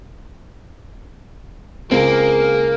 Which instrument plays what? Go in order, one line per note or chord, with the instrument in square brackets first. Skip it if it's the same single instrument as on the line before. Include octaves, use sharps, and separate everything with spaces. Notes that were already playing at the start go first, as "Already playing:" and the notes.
[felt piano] C#2 [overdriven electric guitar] A#3 [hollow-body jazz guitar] C4 [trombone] G#4